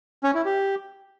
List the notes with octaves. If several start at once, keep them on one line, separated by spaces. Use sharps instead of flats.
C#4
E4
G4